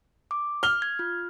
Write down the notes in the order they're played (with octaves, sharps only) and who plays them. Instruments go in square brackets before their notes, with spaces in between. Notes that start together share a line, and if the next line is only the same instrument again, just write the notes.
[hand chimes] D6
[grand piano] F6 G7
[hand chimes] G#6
F4